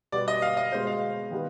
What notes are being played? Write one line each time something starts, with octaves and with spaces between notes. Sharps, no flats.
B2 G3 B3 D5
D#5
F5
D#5
B2 G#3 B3 C5
F5
D#3 G3 B3